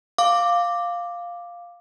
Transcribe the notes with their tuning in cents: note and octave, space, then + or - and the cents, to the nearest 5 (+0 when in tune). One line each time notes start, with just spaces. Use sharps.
F5 +0 D6 +0